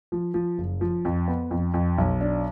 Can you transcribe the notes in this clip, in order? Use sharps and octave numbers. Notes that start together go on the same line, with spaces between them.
F3
F3
F#1
F3
F2
B3
F2
F2
B1
D4